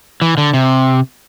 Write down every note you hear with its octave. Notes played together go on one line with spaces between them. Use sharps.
E3
D3
C3